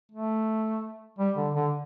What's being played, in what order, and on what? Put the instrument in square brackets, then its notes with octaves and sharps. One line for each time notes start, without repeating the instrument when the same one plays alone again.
[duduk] A3
G3
D3
D3